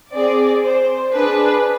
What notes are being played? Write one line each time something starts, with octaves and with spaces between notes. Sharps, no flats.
C4 G#4 D5
C5
D4 G#4 B4